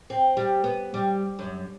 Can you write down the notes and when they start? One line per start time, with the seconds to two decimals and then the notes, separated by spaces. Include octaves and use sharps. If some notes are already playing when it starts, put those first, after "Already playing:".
0.10 C4
0.37 G3
0.64 B3
0.94 G3
1.39 F#2